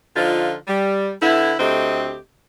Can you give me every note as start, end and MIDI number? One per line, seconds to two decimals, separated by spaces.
0.16 0.54 50
0.16 0.54 53
0.16 0.54 63
0.16 0.54 65
0.68 1.12 55
1.22 1.53 50
1.22 1.53 59
1.22 1.53 64
1.59 2.17 38
1.59 2.17 57
1.59 2.17 60
1.59 2.17 67
1.59 2.17 75